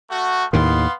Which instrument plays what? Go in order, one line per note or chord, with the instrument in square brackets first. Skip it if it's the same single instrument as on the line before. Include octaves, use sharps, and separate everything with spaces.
[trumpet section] A3 F#4
[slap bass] D#2 A2 D#3 [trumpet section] B3 F5 C6